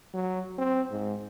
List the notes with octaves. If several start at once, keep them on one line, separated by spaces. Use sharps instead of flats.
F#3
C4
G#2